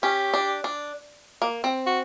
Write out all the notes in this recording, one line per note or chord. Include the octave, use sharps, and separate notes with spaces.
C#4 G4
D4
D4
A#3
C4
F#4